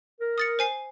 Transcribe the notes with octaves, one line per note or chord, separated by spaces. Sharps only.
A#4
D#6 A6 C#7
C5 G#5 C7